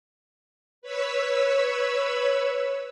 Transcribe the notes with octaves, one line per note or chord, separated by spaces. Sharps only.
B4 C#5 B5 E6